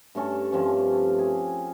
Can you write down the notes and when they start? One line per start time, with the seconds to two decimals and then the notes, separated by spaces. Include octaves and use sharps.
0.15 G2 A3 C#4 A4
0.52 G2 F3 C4 C#4
1.19 G#4